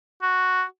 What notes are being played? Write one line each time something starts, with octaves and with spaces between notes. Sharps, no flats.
F#4